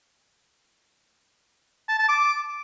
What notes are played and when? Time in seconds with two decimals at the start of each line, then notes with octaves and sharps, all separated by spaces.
1.89 A5
1.99 A5
2.09 D6